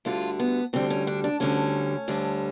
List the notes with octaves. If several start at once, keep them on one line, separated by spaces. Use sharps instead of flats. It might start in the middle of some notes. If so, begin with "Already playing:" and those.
D2 D3 G3 F4
B3
D2 D3 G3 C4
C#4
D4
D4
D2 D3 G3 C#4
D2 D3 G3